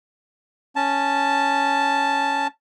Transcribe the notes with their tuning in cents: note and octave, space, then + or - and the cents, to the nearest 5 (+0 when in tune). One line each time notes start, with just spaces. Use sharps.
C#4 +0 A5 +0